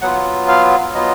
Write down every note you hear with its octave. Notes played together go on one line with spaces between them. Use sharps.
F#3 B3 F4 F#5
F5
F#3 B3 F4 D#5